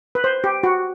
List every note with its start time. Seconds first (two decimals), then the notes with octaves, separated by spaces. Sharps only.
0.15 B4
0.24 C5
0.44 G4
0.63 F#4